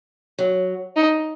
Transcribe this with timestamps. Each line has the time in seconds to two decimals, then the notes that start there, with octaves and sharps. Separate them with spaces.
0.38 F#3
0.96 D#4